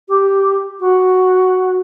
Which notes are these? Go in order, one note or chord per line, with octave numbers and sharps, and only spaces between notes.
G4
F#4